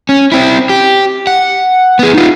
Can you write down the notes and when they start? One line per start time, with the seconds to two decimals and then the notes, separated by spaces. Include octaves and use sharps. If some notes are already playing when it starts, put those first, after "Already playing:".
0.09 C#4
0.32 C4 E4
0.69 G4
1.27 F#5
1.99 B3 G#4
2.14 D#4 F4